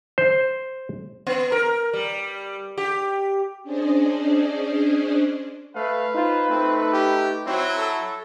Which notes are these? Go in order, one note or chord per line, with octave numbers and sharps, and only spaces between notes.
C5
B3
A#4
G3
G4
C#4 D4 G#4 C5 D5 D#5
A3 B4 F5
D#4 F4 C5
A3 C4
G4
F#3 C4 E4
A4